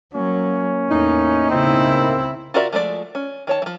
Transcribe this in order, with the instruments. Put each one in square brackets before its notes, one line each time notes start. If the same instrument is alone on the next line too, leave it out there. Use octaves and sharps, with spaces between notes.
[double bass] F#3 [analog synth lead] A#3 [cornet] C#4
[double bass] E2 [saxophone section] A2 D#4
[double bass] C#3 E4 [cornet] C4
[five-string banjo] F4 F#4 A#4 D5 E5
F3 G#3 A3 D5
C#4
D#3 C#5 A5
E3 F3